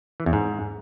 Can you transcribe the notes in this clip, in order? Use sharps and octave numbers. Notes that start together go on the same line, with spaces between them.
E3
E2
G#2